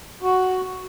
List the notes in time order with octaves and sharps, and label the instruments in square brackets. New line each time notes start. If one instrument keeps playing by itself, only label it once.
[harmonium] F#4